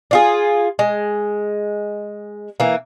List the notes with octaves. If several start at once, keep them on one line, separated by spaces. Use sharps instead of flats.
D4 F4 G#4
G#3
E3 A#3